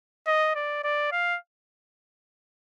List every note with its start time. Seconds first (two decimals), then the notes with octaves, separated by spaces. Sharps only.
0.27 D#5
0.56 D5
0.84 D5
1.12 F5